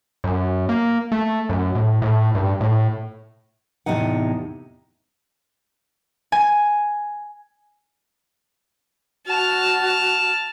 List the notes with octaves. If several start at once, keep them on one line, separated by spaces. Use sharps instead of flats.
F#2
A#3
A3
F#2
A2
A2
G2
A2
E2 A2 C3 D#4 F#5
G#5
F#4 A5 F6